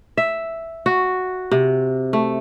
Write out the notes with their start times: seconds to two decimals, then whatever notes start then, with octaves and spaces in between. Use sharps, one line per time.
0.17 E5
0.86 F#4
1.51 C3
2.13 A3